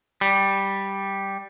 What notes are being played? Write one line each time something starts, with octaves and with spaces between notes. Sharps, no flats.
G3